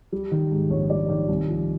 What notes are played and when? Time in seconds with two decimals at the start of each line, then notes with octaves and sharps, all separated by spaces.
0.12 G3
0.32 D#3
0.51 G#2
0.70 A#1 C#5
0.90 G3 D5
1.09 D#3 D5
1.28 C2
1.48 F3